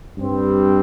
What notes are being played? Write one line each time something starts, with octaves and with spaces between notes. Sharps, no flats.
G2 G3 C4